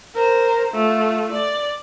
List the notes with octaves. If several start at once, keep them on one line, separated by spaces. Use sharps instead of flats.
A#4 C5
A3 F4
D5